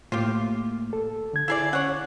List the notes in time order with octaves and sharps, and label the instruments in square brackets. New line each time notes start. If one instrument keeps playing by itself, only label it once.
[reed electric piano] A2 A3 A#3 [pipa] F4 G4
[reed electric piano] A4
D3 G#6
[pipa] E4 G#4 D5
[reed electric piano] C#4 [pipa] C#5 F#5